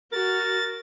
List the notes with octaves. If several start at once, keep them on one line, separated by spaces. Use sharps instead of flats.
F#4 A#4 A6